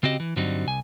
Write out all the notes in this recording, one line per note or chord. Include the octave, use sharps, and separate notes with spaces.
C#3 C4 F#4 G4 D#5
E3
G2 D3 F#3 G3 C4 D#4
C2 G#5